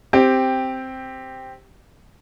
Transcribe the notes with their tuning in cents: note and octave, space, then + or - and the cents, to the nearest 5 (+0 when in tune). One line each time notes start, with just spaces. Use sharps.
C4 +0 G4 +0